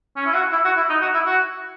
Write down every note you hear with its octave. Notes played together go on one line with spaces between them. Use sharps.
C#4
E4
F#4
E4
F#4
E4
D#4
F#4
E4
F#4